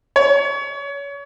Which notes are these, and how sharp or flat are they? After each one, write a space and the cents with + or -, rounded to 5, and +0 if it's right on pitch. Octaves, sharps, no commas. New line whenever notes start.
C#5 +30